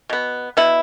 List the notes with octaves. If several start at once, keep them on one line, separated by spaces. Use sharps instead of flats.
B2 B3
B2 B3 E4